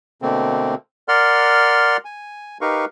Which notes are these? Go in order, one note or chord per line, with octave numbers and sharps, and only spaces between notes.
B2 D3 A3 A#3 C4
A#4 D5 F#5 C6 F6
G#5
D#4 G4 A#4 B4 F5 C#6